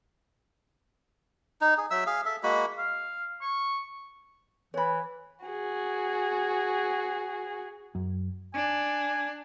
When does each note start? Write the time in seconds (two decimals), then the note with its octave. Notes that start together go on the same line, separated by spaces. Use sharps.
1.61 D#4
1.78 G#4
1.91 F#3 E5 E6
2.06 G#4 F5
2.26 A4 E5
2.43 G#3 A#3 F#4 B5
2.78 F5
3.42 C#6
4.74 E3 C#5 B5
5.45 F#4 G#4
7.95 F#2
8.54 D4 G#5